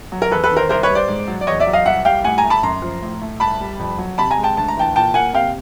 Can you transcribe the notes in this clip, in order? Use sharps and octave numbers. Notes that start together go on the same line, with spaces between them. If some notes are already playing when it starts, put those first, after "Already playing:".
F#3
A#4
E2 A4 B4
A4 B4
D#3
A#4 C5
C2 A#4 C5
B4 C#5
G3
C5 D5
G#2
F#3
D5
E2 C#5 D#5
D5 E5
F#3
D#5 F5
C2 E5 F#5
G3 F5 G5
A2 F#5 G#5
G#5 A#5
A3
A5 B5
F#2 A#5 C6
F3
A2
A3
C2 A5 B5
G3
F2
F#3
C3 A5 B5
G#5 A#5
G#3
G5 A5
D2 A5
A#5
E3 G5 A5
A#2 G5 A5
A#3 F#5 G#5
C3 F5 G5